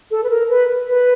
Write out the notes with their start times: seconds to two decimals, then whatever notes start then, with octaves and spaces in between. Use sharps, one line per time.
0.11 A4
0.24 B4
0.30 A#4
0.50 B4
0.89 B4